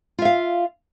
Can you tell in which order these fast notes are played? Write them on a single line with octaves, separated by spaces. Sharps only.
F4 E5 F5